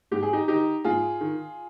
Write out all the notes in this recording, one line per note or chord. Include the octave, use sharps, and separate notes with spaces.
G#2 G4
G#4
D#4 G4
D#3 D#4 G4
G#2 F4 G#4
D#3